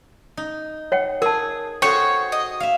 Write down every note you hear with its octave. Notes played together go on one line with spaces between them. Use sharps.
D#4
C#5 F#5 G5
G#4 A#4 A5
F#4 G#4 A4 C5 C#5 G5
D#5
E5 F5